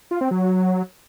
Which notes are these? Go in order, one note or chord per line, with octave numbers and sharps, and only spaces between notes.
F4
C4
F#3